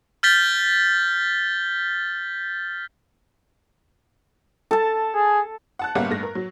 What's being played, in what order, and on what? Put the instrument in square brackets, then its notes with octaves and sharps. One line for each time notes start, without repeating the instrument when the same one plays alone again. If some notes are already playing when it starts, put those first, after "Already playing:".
[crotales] F6 G6 A6 B6 G7
[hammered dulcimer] A4 A5
[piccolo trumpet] G#4
[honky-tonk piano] F#5 A5 F#6
G1 G3 A#3 C#4 E5 F#5
G2 A3 A#6
A#4
F#3